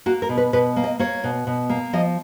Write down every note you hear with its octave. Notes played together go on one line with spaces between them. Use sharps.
A#3 F#4
A#4
B2
B4
B2 B4
A#3
D#5
A#3 C#5
B2
B2
A#3
F3 D#5